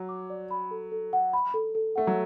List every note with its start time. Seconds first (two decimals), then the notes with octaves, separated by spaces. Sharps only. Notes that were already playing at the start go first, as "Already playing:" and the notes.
Already playing: F#3
0.09 D6
0.30 D5
0.51 B5
0.71 A4
0.92 A4
1.13 F#5
1.33 B5
1.54 A4
1.75 A4
1.96 A3 F#5
2.07 F#3